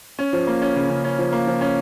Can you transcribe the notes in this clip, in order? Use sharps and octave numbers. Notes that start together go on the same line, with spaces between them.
C#4
F3
A#3
C#4
C#3
C#3
C#4
F3
A#3
F3
C#4